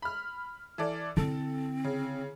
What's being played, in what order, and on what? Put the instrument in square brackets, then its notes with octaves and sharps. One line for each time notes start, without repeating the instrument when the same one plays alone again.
[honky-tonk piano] B5 F6
E3 A4 D5
[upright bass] D3 E4 [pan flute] C4 [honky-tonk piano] A4
[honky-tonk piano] C#3